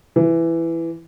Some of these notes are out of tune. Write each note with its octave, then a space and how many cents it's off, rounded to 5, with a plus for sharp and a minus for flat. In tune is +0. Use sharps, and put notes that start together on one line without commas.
E3 +10